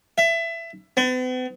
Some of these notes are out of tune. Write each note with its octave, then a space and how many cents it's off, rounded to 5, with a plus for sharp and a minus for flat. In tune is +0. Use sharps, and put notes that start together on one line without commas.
E5 +20
B3 +45